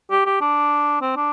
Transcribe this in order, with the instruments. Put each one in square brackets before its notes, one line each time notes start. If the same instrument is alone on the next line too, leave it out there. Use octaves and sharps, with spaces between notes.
[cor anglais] G4
G4
D4
C4
D4